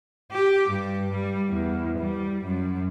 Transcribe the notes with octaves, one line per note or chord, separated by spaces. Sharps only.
G4
G2
G3
E2
G3
F#2